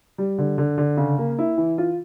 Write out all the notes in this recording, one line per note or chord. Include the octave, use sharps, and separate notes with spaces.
G3
D3
D3
D3
C#3
A#3
E4
E3
F4